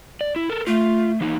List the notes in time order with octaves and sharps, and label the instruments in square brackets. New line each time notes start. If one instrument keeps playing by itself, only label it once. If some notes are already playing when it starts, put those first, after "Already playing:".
[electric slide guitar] D5
E4
A4 A#4
[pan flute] A3 [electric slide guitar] F4
[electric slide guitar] E3 A#3 D#4